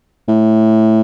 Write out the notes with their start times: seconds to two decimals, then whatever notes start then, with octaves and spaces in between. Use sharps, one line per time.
0.28 A2